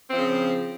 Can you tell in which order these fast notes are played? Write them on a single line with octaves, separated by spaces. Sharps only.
C4 F3 C#3